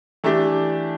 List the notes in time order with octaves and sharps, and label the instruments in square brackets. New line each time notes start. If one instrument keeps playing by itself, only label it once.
[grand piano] E3 A3 D4 G4